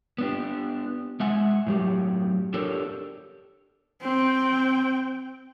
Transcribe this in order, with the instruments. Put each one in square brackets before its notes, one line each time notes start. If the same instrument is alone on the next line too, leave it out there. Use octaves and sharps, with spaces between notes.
[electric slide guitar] B3 D4 G4
G#3 E5 F#5 G#5
A2 F#3 G4
D4 G4 A4 A#4 C#5 D5
[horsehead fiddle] C4 G5